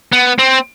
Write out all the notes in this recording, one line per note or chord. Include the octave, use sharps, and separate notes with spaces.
B3
C4